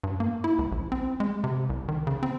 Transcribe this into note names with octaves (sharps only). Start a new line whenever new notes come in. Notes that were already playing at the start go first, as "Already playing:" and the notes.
G2
A#3
E4
C#2
A#1
C4
G#3
C3
C2
D#3
C#3
C4